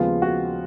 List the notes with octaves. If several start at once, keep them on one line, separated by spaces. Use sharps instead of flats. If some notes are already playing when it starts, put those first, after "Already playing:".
Already playing: D#2 C#3 F3 G#3 B3 F4
F#4